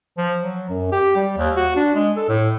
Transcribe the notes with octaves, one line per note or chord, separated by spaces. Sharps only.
F3
F#3
F#2
G4
G3
D#2
F#4
D4
G#3
A4
A2